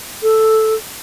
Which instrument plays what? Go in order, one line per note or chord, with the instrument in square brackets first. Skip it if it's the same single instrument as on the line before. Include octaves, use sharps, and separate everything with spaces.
[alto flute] A4